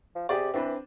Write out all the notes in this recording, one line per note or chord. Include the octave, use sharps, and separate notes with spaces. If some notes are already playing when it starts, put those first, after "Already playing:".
F3
C3 G4 G#4 D5
E3 C4 D4 B4